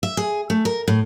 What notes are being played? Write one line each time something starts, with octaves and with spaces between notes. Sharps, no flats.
E5
G#4
A3
A#4
A2